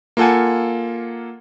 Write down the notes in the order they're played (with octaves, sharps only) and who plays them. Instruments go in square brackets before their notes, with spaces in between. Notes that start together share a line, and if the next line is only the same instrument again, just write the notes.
[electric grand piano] A#3 F4 A4 F#5 G#5